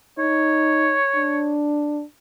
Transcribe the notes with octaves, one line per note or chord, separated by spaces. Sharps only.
D#4 C#5
D4